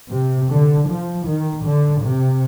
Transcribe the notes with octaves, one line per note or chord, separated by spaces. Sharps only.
C3
D3
F3
D#3
D3
C3